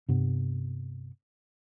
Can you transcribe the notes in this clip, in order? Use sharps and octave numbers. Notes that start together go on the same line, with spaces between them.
G2 C3 B3